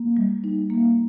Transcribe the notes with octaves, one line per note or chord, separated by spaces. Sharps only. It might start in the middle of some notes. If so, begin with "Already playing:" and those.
Already playing: A#3
G3
D#4
A#3